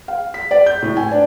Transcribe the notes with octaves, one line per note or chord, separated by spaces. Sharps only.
F5
B6
D5
G6
A2
G#5
D4